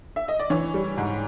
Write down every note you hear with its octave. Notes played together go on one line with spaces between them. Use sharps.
E5
D#5
D5
E3 C#5
G3
G#2